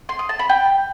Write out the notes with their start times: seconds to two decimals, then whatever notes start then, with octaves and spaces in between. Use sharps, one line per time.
0.09 C6
0.19 D#6
0.29 A5
0.39 B5
0.49 G5